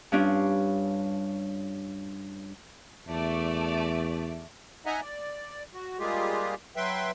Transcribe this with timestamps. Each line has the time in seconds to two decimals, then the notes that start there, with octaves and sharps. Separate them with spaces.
0.12 G2 C#4 D4 F4
3.08 E2 A3 D5
4.86 D#4 D#5 E5 F#5 G#5 A#5
5.01 D5
5.74 F#4
5.99 G3 G#3 A#3 F4 G4 G#4
6.76 F#3 B4 E5 G5 C6